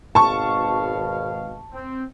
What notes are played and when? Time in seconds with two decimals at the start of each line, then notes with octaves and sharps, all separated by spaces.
0.15 G#1 B2 F5 A5 C#6
1.73 C4